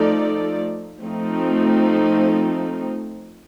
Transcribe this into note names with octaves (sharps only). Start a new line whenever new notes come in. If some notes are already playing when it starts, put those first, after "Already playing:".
Already playing: F3 A3 D#4 A4 D5
F3 A3 C4 D#4